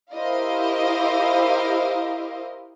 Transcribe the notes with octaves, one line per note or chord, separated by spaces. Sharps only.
E4 G4 A#4 C5 D#5 F5